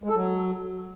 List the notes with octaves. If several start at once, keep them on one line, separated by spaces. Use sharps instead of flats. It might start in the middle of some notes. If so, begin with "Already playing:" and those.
G#3
A4
F#3